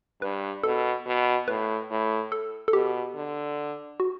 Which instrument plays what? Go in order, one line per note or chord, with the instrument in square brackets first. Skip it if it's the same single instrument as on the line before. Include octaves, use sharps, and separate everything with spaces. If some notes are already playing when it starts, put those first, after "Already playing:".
[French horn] G2 [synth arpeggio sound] B4
[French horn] B2 [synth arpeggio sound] A4
[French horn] B2
[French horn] A2 [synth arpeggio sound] B4
[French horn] A2
[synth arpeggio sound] A4
A4
[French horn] B2 [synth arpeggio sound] G4
[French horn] D3
[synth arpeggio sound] F#4